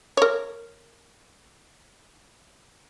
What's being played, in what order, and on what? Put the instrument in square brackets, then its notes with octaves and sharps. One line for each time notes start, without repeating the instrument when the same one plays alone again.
[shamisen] A#4 C#5